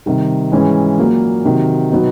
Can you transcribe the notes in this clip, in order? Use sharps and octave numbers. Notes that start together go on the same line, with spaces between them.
C3 D#3 G3
G#2 E3 G#3 C#4
A#2 F#3 A#3
C3 D#3 F#3
B2 F#3 B3 D#4